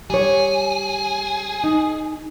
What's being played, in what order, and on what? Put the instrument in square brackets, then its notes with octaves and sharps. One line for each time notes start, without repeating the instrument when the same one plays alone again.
[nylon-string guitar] G3 C#5 [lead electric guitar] G#4
[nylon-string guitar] D#4